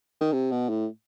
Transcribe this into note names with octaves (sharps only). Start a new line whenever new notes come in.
D#3
C3
B2
A2